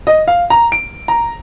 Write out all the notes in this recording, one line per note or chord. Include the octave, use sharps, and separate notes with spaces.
D#5
F5
A#5
D7
A#5